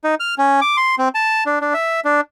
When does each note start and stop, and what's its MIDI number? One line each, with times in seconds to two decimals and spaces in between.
0.04 0.15 63
0.20 0.35 89
0.38 0.60 61
0.61 0.77 86
0.77 0.95 84
0.98 1.09 60
1.15 1.44 81
1.46 1.59 62
1.61 1.74 62
1.74 2.00 76
2.05 2.21 62